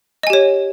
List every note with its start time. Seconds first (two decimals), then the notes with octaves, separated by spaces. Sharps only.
0.23 D#5
0.27 G#5
0.30 G4
0.33 C#5